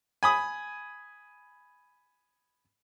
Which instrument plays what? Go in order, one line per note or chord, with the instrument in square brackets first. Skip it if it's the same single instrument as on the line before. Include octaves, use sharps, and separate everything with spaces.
[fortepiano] G#5 B5 D#6